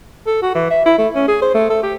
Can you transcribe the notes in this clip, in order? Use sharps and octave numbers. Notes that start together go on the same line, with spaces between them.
A4
F#4
E3
E5
E4
A3
C#4
G#4
C5
A3
A4
G4